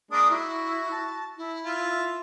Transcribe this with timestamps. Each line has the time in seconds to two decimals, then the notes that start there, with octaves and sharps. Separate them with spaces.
0.11 G#3 A#3 D4 D#6
0.31 E4 F#4
0.91 A5
1.37 E4
1.64 F4 E5